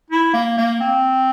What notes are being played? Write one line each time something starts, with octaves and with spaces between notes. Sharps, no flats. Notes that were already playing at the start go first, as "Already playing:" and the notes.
E4
A#3
A#3
C4